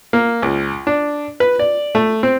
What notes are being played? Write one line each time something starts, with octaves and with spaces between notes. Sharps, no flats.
A#3
C#2
D4
B4
D5
A3
C4